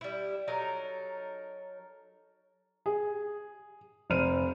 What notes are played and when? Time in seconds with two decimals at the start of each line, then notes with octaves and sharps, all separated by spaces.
0.01 G3 E4
0.48 F#3 D#4 A4 A#4
2.86 G#4
4.10 F1 C5 F6 D#7